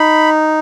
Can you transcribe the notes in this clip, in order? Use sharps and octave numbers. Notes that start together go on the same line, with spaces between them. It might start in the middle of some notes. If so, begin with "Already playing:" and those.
Already playing: D#4 B5